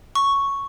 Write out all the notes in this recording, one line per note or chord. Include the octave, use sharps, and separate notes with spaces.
C#6